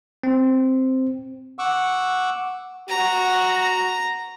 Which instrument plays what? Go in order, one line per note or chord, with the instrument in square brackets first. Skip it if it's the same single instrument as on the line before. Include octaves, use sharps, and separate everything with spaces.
[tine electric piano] C4
[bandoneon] F#5 C#6 D6 E6
[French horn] F#4 [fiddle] A#5